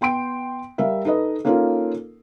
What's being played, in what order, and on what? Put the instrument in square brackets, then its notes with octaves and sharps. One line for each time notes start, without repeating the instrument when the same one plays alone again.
[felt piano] B3 G5 C6 D7
G3 A#4 E5 F5
D#4 A4 B4 D#5
A#3 C#4 D#4 F4 A4 A#4